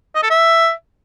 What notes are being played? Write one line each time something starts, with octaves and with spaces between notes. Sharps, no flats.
D#5
A4
E5